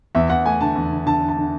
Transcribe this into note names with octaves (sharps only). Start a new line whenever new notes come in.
E2 E5
E2 F#5
A3 G#5
D3 A5
E2
D3
D3 A5
D3
A5
D3